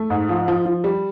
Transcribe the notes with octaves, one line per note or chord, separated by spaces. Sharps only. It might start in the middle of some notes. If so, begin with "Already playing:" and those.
Already playing: A3
G#2
F3
F3
F3
G3